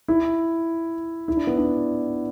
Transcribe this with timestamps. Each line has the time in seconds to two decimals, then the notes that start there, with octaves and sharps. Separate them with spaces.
0.08 E4
1.28 E4
1.37 D4
1.47 B3
1.57 D4